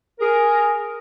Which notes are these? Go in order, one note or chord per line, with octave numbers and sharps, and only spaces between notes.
G#4 A#4